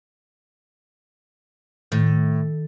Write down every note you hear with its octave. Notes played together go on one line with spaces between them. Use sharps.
A2 D#3